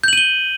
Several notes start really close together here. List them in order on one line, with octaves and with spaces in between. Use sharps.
G6 F#7 D#7 G7